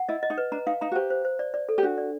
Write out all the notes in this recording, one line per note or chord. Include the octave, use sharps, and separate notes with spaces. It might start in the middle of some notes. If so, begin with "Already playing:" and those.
Already playing: F#5
E4 D#5
D#5
D#4
B4
D4 A#5
D#4 F5
D#4 A#5
F#4
G4 C5
C5
C5
D5
D5
A4
G4
D4 F#4
D5